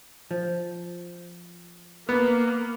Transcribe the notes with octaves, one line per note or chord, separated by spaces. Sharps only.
F3
A#3 B3